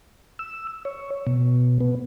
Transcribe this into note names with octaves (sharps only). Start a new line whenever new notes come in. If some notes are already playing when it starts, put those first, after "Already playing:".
E6
C#5
B2
B3